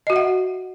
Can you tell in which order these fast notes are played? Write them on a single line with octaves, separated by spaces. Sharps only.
D#5 F#4 E5 F#5